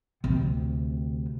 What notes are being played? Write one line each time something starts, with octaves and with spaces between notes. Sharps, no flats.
D2 C3